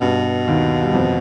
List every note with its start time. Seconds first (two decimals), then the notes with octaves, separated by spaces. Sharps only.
0.01 G2 B2 G3
0.48 D#2 D#3
0.83 G3
0.94 F2 F3